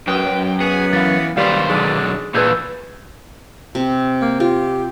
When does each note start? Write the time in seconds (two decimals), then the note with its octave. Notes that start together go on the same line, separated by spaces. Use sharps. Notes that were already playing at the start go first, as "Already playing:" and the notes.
0.08 F#2 B4 G5
0.60 B3 G#4
0.93 E3 F5 A6
1.37 D#2 D#3 G3 B4 C5 F5
1.69 B1 D3 D4 G#4
2.35 A#2 E3 D4 G#4 B4 E6 G6
3.75 C3
4.22 A#3
4.40 F4 G4